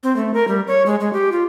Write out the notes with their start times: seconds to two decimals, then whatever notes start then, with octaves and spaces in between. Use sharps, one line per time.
0.03 C4
0.16 A3
0.34 A#4
0.48 G3
0.67 C#5
0.86 G#3
1.00 G#3
1.13 G4
1.32 F4